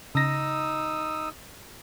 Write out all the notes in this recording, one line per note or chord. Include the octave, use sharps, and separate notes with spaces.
C#3 D#4 D#6 E6 A#6